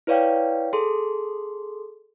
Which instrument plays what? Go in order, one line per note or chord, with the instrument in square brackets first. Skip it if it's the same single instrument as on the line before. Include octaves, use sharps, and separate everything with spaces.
[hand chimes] E4 B4 C#5 D5 F5 G5
G#4 A4 C6